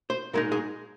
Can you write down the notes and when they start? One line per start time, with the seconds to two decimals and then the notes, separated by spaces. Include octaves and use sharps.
0.10 C5
0.33 A#2 G#3 D#4 A#4
0.52 G#4